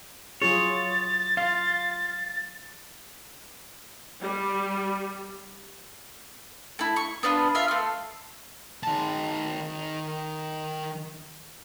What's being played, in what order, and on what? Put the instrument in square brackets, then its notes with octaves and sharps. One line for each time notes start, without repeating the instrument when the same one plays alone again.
[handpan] F#3 F4 G#4 [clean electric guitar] C#5 [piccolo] A6
[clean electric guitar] F4 [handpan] F5
[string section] G3
[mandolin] A3 E4
C#6
B3 D4 F4 B4
F4 E5 F5
A3 C6
[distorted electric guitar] D#3 A5